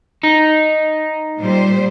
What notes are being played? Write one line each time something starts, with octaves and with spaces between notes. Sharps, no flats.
D#4
A#2 G3 C5